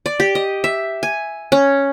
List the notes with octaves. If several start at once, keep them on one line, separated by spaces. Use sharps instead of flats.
D5
G4
D#5
E5
G#5
C#4